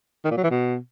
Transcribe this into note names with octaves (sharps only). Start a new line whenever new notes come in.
D#3
A#2
F#3
E3
B2